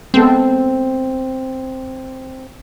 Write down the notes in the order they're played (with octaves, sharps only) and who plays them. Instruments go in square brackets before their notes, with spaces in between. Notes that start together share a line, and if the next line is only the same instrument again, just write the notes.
[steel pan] G#3 B3 A4 [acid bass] C4